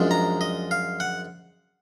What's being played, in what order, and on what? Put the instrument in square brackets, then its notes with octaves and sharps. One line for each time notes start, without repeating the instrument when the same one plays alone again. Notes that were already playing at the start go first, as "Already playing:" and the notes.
Already playing: [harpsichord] F#2 F3 G#3 D4
A#5
D#5
F5
F#5